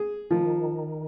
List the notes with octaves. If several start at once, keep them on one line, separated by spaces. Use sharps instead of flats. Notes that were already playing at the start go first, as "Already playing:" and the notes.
Already playing: G#4
D#3 F3